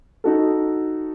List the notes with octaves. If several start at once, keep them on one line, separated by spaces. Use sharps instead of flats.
D#4 F#4 A4